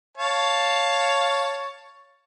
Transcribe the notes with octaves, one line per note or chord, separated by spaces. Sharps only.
C#5 F5 A5